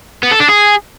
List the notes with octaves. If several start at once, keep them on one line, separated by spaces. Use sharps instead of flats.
B3
A4
D4
G#4